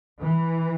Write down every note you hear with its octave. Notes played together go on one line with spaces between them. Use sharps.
E3